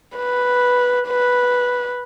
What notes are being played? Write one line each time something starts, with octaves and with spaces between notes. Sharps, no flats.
B4
B4